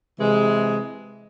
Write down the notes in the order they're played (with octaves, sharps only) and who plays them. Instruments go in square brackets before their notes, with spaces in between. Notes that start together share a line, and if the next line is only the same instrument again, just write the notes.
[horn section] C3 E3 G#3